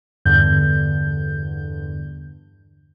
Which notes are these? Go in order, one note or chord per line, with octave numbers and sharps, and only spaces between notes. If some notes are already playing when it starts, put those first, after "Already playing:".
E2 G2 D3 G6